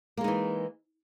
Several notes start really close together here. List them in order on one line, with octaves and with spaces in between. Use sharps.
A#3 G#3 D#4 E3